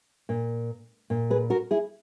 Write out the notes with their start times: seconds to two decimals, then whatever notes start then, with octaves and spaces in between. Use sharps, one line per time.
0.29 A#2
1.10 A#2
1.30 G#4 B4
1.50 F#4 A#4
1.71 E4 G#4